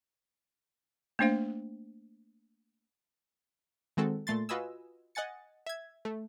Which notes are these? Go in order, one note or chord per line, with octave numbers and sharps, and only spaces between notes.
A3 A#3 D4 C5 F5
D#3 G#3 C4 F#4 A4
A#2 A3 C6 A6
F4 F#4 B4 D#5 G#5 E6
D#5 F#5 G#5 A6 C#7
E5 G#6
A3